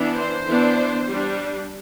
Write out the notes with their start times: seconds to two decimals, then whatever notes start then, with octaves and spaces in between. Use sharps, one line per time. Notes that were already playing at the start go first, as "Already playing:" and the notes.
Already playing: E3 B3 D4
0.14 C5
0.45 E3 B3 D4
1.08 G3 D4